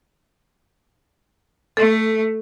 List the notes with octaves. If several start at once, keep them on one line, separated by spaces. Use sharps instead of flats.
A3 A4